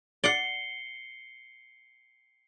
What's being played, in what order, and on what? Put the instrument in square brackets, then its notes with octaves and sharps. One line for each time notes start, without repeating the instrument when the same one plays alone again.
[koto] D5 F#5 [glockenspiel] C7 C#7 G7